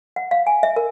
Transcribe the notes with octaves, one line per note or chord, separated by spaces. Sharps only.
F#5
F5
G#5
E5
A#4